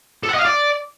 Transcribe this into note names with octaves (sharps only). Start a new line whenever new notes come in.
A4
F#5
D#5
F5
D5